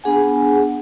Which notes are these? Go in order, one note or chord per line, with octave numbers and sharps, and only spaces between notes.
B3 D4 G#4 F#5 G#5